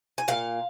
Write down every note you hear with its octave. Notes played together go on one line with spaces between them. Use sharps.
G#5
A#2 F5